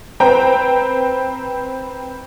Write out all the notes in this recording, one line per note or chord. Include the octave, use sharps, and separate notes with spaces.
C4 B4 C5 G5 A#5